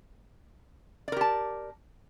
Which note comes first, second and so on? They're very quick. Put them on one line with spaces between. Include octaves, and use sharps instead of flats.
D5 A#4 G4 A5